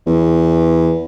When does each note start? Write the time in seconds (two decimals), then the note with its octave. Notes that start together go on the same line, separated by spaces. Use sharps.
0.06 E2